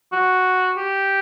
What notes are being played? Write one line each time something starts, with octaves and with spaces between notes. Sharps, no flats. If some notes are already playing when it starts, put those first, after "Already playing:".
F#4
G4